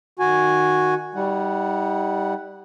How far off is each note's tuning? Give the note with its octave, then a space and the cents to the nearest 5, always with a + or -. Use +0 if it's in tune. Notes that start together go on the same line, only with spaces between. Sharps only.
D#3 -20 F#4 -10 G#5 +0
G3 +0 D#4 +45 F#5 +0